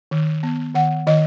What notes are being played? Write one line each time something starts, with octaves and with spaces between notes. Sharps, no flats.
D#3
B3
D#3 F#5
D#3 D#5